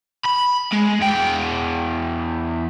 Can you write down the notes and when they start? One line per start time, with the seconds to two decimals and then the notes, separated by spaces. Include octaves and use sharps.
0.26 B5
0.73 G#3
1.01 E2 G5